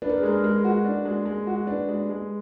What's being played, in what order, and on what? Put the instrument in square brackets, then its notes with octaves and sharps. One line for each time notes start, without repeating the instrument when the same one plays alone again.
[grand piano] D4 [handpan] B4
[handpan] A#4
G#4
[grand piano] G#3 [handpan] A#4
[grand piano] G#3
F#4
D4
G#3
G#3
F#4
[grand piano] D4 [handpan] B4
[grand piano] G#3
G#3